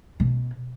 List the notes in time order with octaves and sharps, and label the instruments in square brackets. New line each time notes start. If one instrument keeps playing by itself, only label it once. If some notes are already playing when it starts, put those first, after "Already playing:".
[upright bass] B2